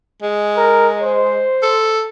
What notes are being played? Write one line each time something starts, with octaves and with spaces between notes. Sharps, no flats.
G#3
A#4
C5
A4